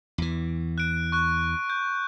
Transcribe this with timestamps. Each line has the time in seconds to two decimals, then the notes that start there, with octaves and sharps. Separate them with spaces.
0.18 E2 E3
0.78 F#6 D7
1.12 C#6 F#6
1.70 G6